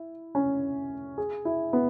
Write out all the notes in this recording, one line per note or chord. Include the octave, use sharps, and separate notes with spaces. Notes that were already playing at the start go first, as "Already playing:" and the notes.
Already playing: E4
C#4
G#4
E4
B3